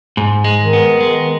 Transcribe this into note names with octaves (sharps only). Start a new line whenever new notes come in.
G#2
G#3
D#3
B3
G#3